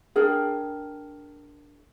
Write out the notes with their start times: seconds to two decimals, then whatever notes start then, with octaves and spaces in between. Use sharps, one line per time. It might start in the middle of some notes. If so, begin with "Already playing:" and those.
0.16 D4 G#4 A#4 G5